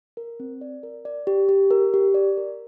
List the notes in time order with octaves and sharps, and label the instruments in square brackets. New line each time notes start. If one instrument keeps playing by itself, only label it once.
[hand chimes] A#4
C4
D5
A#4
D5
G4
G4
A#4
G4
D5
A#4